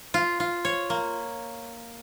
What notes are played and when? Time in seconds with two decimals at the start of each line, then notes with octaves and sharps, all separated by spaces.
0.14 F4
0.40 F4
0.65 C#5
0.90 A#3